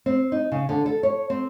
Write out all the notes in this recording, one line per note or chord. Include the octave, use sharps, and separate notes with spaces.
C4
D#4
C#3
D3
A4
C#5
C4